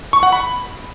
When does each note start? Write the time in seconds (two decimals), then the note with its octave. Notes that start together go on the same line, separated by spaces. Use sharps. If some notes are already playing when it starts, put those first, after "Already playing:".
0.13 C#6
0.23 F#5
0.33 B5